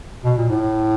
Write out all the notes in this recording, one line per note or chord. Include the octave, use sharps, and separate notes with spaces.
B2
A#2
A2